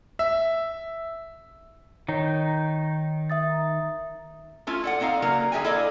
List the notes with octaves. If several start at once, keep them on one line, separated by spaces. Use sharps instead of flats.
E5
D#3 D#4 C#5
E5 D#6 A6
A3 C#4 E4 F4
A4 D5 F#5
C4 D4 D#4 D5 F5
C#3 F#3 A#3 A#4
D3 G#4 E5 G5 G#5
E4 A4 D5 D#5 F5